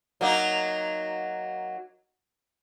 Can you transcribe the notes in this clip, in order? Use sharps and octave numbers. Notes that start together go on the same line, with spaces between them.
F#3 A#3 D#4